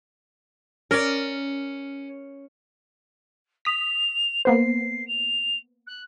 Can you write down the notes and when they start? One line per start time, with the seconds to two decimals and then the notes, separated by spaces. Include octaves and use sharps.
0.91 C#4 A#4 D5
3.65 D#6 B6 F7
4.45 A#3 B3 C5 C7
5.07 F7
5.87 F#6